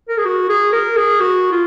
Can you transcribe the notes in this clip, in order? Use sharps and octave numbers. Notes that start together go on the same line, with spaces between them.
A#4
G#4
F#4
G#4
A#4
G#4
F#4
F4